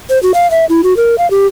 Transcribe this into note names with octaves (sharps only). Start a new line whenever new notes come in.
C5
F#4
F5
E5
E4
F#4
A#4
F5
G4